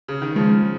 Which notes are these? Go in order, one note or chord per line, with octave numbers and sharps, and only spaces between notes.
C#3
D#3
C#3 F3 G#3